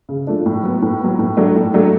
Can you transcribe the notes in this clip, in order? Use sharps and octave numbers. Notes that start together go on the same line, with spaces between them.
C#3
F3 A3 D4
A2
F#3 B3
A2
F#3 B3
A2
F#3 A3 D4
A2
F#3 A3 D4